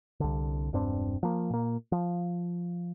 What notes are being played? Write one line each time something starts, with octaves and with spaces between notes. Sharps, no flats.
C2 D3
E1 G2 C4 D4
F3 A#3
A#2 A#3
F3